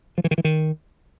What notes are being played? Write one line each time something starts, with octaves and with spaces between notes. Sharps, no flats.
F3
E3
D#3
E3
D#3